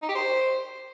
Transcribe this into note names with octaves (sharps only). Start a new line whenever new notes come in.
D#4
G4
C5